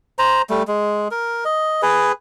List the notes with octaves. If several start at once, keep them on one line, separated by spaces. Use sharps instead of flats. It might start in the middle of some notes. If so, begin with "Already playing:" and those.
C5 A#5
G3 A3
G#3
A#4
D#5
G#4 B4